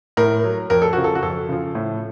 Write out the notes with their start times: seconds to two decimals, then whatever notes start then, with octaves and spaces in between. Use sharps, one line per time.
0.17 A2 A#4
0.44 F#3
0.70 F2 A#4
0.82 A4
0.93 C#3 F3 F#4
1.04 A4
1.15 F#4
1.23 F2 A4
1.49 C#3 F3
1.75 A2